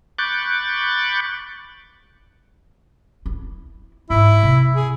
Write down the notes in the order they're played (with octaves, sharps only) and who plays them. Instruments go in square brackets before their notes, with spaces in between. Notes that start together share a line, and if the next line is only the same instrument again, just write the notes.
[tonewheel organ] B5 C#6 D6 F#6 G6 A6
[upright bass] E4
[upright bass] G#2 [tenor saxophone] E4
[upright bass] C3
[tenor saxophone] G#4